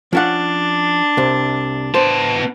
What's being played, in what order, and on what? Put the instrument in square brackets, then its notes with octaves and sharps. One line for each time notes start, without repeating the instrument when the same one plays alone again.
[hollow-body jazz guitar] F3 C#4 F#5 [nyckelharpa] D4
[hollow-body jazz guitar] C2 C3
[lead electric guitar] B3 A5 [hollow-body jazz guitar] C5